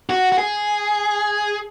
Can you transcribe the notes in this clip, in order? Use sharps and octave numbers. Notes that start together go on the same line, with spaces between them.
F#4
F#4
G#4